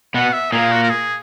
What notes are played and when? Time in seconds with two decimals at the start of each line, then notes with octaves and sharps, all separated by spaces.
0.14 B2 B3 F#5
0.33 E5
0.52 A#2 A#3 G#4
0.72 F#4
0.83 A#4
0.90 G#4